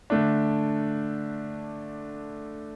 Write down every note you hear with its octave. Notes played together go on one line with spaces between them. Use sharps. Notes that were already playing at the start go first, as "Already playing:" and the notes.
D3 A3 D4